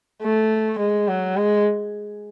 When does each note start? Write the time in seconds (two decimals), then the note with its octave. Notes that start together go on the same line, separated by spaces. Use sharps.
0.22 A3
0.79 G#3
1.08 F#3
1.37 G#3